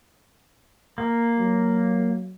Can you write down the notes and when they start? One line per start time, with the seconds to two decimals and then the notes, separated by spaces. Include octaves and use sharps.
0.98 A#3
1.39 F#3